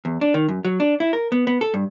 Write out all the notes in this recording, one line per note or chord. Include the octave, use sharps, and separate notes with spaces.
E2
D4
D#3
F#2
F#3
D4
E4
A#4
B3
B3
A4
G2